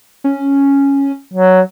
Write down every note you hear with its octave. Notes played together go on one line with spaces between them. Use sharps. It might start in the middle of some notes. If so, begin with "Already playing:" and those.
C#4
F#3